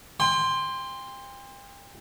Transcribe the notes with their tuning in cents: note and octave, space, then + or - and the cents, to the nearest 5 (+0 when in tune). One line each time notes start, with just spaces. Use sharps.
G5 +35 C6 +0